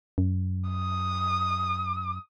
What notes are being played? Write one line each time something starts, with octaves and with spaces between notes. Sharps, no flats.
F#2
D#6